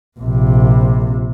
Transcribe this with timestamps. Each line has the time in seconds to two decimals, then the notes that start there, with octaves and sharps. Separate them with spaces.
0.19 A#1 C3